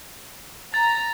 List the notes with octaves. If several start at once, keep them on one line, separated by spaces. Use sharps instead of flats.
A#5 A6